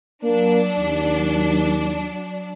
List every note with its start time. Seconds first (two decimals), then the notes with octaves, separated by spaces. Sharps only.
0.24 F#3 A#3 D4
0.78 D#2